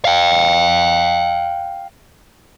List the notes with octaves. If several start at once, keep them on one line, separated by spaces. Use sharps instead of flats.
F5 G5